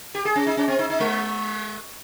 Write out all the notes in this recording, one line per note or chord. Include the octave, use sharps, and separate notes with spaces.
G4
G#4
C#4
D#4
C#4
C4
D#4
D#4
G#3